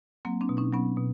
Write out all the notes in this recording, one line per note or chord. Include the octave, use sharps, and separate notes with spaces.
F#3 A#3 C4
C4 D4
B2
C#4 D#4
F#3 B3 C#4
B2